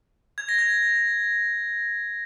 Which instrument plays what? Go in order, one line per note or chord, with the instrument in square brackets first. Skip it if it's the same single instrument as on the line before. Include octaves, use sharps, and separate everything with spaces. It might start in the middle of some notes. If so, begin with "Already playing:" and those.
[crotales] G#6
A#6
G#6